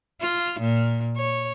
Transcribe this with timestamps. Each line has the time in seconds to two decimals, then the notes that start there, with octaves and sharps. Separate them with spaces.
0.21 F4
0.60 A#2
1.16 C#5